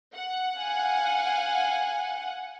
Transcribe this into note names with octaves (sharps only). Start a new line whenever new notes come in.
F#5
F5 G#5